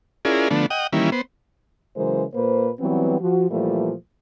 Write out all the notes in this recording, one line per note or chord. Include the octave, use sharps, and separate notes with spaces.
C#4 E4 F4 G#4 A#4 D5
D3 F3 A3 B3 D4
D#5 F#5 G5 D#6
D#3 E3 G3 A#3 C#4 E4
B3 C5
C#3 E3 F#3 G#3 A#4 C5
A#2 A#3 B4 C5
E3 F#3 G3 B3 C4
F3 F#4
A#2 E3 F3 G3 A3 A#3